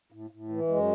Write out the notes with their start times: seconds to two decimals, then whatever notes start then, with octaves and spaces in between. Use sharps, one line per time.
0.12 A2
0.30 A2
0.49 E3
0.68 F#2 G#3